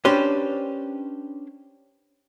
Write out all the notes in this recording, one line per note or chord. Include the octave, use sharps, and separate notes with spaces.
C#4 D4 G4 B4 C5